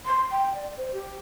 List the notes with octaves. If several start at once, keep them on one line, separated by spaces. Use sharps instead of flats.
C6
G5
D5
C5
G4